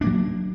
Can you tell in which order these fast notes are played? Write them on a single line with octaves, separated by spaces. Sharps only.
D4 A#3 F#3